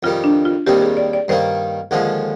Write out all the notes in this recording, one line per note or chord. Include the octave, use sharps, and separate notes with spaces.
F2 D#3 G3 F4
D4
F4
D#2 D#3 G3 C4 G4
G#4
D5
D5
G2 D#3 A#3 D#4 C5
D#2 D3 F3 G#3